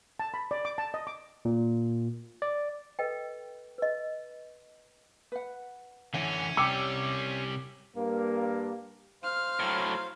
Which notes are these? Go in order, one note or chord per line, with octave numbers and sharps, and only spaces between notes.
A5
B5
D5
D6
A5
D#5
D6
A#2
D5
A4 B4 D#5 G5
B4 D#5
B4 F#5
D3 E3 C#4 F#5
C3 G3 G4 D6 E6 C#7
G2 A#3
C5 F5 F6
A2 F#3